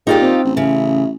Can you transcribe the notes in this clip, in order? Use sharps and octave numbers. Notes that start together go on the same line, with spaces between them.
A#2 D#4 F4 G4 G#4
C4
A1
C#3 E5